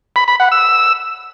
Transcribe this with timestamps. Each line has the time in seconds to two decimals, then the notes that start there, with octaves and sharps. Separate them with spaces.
0.16 B5
0.28 B5
0.40 F#5
0.52 E6